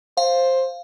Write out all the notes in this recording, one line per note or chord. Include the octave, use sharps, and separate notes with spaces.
C5 F5